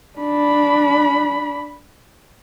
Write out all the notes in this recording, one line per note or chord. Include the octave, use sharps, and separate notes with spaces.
D4 B5